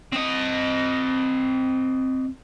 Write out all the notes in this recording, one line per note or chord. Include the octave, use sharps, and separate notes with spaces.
C4 D#5